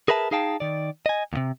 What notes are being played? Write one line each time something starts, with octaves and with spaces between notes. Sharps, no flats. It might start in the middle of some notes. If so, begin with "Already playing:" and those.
G#4 A#4 B4 E5 A5
D#4 G#4 F5 G5 A5
D#3 D5
D#5 G#5
D#2 C3